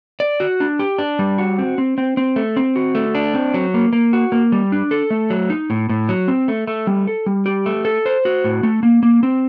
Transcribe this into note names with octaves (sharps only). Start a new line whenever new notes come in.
D5
F#4
D4
G4
D4
G3
F#4
C4
C4
C4
C4
A3
C4
F#4
A3
D4
C4
F#3
A#3
A#3
F#4
A#3
G3
D4
A4
A3
F#3
D#4
A2
A2
F#3
C4
A3
A3
G3
A4
G3
G4
A3
A4
C5
F#4
A2
A3
A#3
A#3
C4